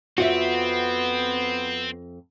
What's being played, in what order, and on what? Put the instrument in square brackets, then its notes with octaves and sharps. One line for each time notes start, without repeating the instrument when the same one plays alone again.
[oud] F2 D#5 E5 [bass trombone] B3 [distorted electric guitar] C4 [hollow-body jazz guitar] F4 F#4